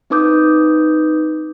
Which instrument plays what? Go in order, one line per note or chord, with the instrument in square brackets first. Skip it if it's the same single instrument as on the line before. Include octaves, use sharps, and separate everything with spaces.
[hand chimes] C4 D#4 B4 D6 D#6 G6